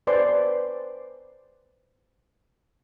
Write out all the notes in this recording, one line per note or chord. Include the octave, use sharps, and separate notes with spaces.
B4 C5 D5 G#5 C6 D6